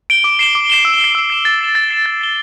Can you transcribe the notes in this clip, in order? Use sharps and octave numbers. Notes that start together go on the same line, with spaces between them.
D7 G7
D6
C7 E7 G7
D6
C7 E7 G7
E6
C7 E7
E6
C7 E7
A6
C7 E7 G7
A6
C7 E7 G7
A6
C7 E7 G7